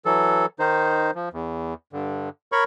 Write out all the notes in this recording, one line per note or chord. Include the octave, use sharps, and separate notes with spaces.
E3 F#3 A4
D#3 D#4 C5
F3
E2
G2 D3
A#4 C#5 B5 C#6